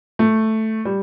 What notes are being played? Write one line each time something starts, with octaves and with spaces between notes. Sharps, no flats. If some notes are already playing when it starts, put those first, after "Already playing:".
A3
G3